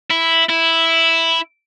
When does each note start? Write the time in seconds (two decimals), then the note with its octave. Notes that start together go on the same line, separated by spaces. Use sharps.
0.11 E4
0.49 E4